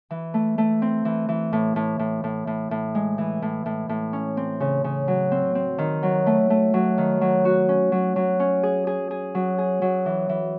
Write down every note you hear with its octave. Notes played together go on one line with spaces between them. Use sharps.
E3
A3
A3
C4
E3
E3
A2
A2
A2
A2
A2
A2
G#3
E3
A2
A2
A2
C#4
C4
C#3
C#3
F#3
C4
C4
D#3
F#3
A3
A3
F#3
D#3
F#3
F#4
C#4
F#3
F#3
C#4
G#4
G#4
G#4
F#3
G#4
F#3
E3
E3